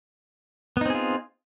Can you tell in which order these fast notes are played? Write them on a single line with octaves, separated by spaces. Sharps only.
B3 D#4 C4 G#4 F4